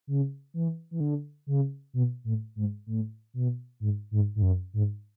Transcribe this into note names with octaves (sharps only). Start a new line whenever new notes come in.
C#3
E3
E3
D3
C#3
B2
A2
G#2
A2
B2
G#2
G#2
G#2
F#2
G#2